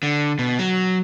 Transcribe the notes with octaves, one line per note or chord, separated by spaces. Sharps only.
D3
B2
F#3